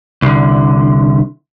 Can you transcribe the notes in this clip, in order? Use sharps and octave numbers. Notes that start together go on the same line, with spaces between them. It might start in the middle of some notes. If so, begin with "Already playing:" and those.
C2 D3